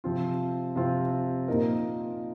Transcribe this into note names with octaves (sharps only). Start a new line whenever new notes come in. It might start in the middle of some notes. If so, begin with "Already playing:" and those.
C3 F3 C4 F4
C3 F3 C4 F4
A#2 A#3 D#4 A#4